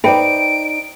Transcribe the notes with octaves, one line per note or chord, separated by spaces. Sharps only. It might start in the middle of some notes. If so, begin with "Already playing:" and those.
D#4 B4 C5 D5 E5 G5 D7